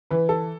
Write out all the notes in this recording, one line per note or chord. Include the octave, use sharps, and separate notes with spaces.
E3 B4
A4